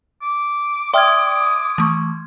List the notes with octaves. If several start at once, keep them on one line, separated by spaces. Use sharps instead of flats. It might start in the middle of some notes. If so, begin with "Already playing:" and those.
D6
D5 E5 G5 C6 D#6 F6 G#6
E3 A3 C#6